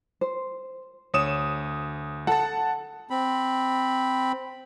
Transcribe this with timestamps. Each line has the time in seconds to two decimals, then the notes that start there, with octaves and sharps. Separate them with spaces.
0.21 C5
1.14 D2 C#5 D#6 E7
2.27 A4 F#5 A5
3.10 C4 B5